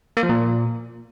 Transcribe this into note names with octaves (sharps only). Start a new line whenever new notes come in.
A#3
F3
A#2